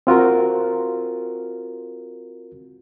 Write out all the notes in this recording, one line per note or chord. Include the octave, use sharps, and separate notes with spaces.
C4 F4 F#4 A#4